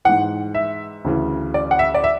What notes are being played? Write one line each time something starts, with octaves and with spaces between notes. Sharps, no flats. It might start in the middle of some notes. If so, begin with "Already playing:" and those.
G#2 E3 F#5
E5
D2 C#3 E3
D5
F#5
E5
D5
E5